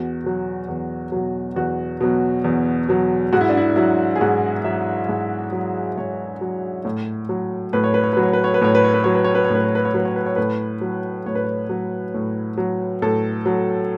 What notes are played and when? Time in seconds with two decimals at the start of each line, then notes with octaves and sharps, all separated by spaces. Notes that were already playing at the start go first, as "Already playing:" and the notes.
Already playing: E2 F#4
0.24 B2 F#3
0.68 E2
1.12 B2 F#3
1.56 E2 F#4
2.01 B2 F#3
2.44 E2
2.88 B2 F#3
3.33 G#2 F#4
3.41 E4
3.49 D4
3.57 E4
3.76 F#3 E4
4.16 G#4
4.21 G#2 F#4
4.64 F#3 E5
5.09 G#2
5.52 F#3
5.97 G#2 C#5
6.41 F#3
6.85 A2
7.29 F#3
7.73 A2 B4
7.84 C#5
7.94 B4
8.04 C#5
8.13 F#3 B4
8.23 C#5
8.33 B4
8.44 C#5
8.54 B4
8.61 A2 C#5
8.75 B4
8.84 C#5
8.94 B4
9.04 F#3 C#5
9.15 B4
9.24 C#5
9.35 B4
9.44 C#5
9.50 A2 B4
9.64 C#5
9.75 B4
9.85 C#5
9.94 F#3 B4
10.05 C#5
10.16 B4
10.26 C#5
10.36 A2 B4
10.81 F#3
11.26 A2 C#5
11.35 B4
11.44 C#5
11.69 F#3
12.14 A2
12.57 F#3
13.02 A2 A4
13.46 F#3